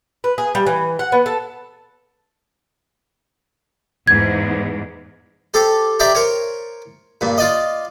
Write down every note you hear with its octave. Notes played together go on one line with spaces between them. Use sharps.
B4
G#4
G3
E3
F#5
B3
A4
E2 G#2 G#6
G4 A4 C5
G4 C5 D5 E5 G5 A#5
A#4 C5 C#5
G2 A#2
F4 D5 D#5